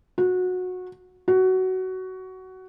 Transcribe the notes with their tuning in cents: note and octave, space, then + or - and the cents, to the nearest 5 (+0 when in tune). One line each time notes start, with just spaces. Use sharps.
F#4 -20
F#4 +15